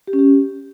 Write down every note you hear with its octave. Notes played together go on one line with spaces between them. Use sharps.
G4
C#4
G4